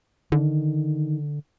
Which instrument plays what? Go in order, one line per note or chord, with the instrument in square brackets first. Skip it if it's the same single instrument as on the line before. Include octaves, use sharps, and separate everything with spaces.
[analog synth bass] D3 [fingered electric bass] D#3